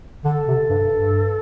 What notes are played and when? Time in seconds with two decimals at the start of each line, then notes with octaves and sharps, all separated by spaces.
0.25 D3 A4
0.48 C3
0.70 G2
0.92 G2